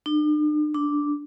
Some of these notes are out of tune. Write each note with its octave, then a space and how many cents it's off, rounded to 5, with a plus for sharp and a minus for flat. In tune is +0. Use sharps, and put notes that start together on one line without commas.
D4 +45
D4 -5